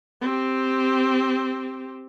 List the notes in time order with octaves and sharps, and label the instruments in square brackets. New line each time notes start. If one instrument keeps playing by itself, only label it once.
[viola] C4 G4